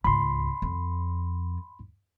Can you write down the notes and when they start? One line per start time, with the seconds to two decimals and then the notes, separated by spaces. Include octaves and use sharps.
0.04 C#2 G#2 B5 C6
0.62 F2